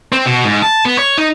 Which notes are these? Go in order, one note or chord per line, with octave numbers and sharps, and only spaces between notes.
C4
B2
G#2
A5
B3
C#5
D#4